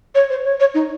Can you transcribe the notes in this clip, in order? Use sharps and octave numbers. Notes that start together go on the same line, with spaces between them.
C#5
C5
C#5
C#5
D#4